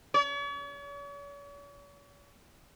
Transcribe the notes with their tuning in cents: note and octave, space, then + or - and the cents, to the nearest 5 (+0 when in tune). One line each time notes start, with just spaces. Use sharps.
C#5 +45